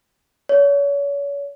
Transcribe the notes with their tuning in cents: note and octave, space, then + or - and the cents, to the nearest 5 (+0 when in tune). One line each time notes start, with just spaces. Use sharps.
C#5 +35